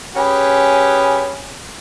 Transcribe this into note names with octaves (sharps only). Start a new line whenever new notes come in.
C#4 G4 G#4 B4